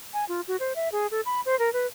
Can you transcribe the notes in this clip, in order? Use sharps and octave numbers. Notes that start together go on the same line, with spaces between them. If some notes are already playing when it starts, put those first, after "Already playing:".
G#5
F4
F#4
C5
E5
G#4
A4
B5
C5
A#4
B4